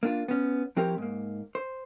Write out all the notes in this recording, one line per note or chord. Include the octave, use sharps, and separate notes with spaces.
A#3 D4 F4
B3 C#4
F3 C4 E4 G4 A#4 C#5
G#2 A#3
C5